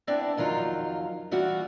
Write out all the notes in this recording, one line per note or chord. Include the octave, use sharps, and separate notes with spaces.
B3 C4 D4 E4 D5
F2 D#3 F#3 F4
E3 G3 F4 F#4